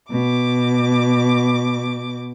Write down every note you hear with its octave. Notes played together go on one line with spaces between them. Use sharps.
B2 D6